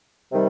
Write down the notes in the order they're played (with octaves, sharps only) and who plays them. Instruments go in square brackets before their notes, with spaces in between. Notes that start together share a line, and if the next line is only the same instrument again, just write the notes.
[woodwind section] C3 D#3 G3